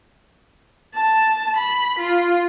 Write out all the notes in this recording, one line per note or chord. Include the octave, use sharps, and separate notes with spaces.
A5
B5
F4